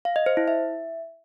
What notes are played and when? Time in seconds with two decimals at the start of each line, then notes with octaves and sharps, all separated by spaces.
0.05 F5
0.16 D#5
0.26 C5
0.37 E4
0.48 E5